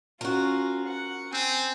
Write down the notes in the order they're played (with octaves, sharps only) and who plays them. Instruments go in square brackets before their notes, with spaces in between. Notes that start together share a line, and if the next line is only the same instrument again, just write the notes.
[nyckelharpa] C#4 F4 [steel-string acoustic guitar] F#4 A#4
[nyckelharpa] F#5
[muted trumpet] C4 [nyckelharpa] G#5